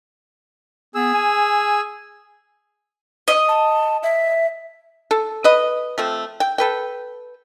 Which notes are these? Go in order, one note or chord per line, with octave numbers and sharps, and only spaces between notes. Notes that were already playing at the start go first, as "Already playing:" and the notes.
B3 G#4 E6
G#5
D#5
A5
E5
A4
B4 D#5
F3 A3 C4
G5
A4 B4 G5